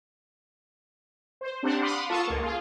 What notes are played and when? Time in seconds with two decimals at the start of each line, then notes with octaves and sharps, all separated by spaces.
1.41 C5
1.63 C4 D4 G4 C5 F#5
1.82 F5 F#5 B5 C6 D6 D#6
2.09 F4 A4 A5 C#6 D#6
2.27 C#2 A#3
2.43 F4 G#4